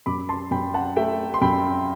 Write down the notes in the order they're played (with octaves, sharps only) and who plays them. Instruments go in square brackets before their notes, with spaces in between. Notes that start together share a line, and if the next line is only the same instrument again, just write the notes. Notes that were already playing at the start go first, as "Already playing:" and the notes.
[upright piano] F#2 B5 D6
A5 C6
F#2 G5 B5
F#5 A5
A3 E5 G5
C6
F#2 G5 B5